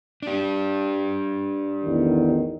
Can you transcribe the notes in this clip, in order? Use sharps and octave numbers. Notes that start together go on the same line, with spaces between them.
D4 G4
A1 E2 D#3